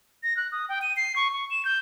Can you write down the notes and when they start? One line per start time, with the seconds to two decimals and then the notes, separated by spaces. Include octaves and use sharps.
0.23 A#6
0.37 F#6
0.52 D#6
0.69 G5
0.82 D#7
0.97 C7
1.16 C#6
1.33 C#6
1.50 E7
1.65 G6